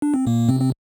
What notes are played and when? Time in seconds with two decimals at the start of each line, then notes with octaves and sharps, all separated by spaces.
0.02 D4
0.14 C4
0.27 A#2 A#3
0.49 C3 C4
0.61 C4